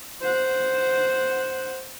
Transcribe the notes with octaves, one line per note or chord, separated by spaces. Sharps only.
C5 F#5